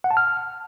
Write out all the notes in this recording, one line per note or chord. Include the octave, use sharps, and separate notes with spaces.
F#5
A5
F6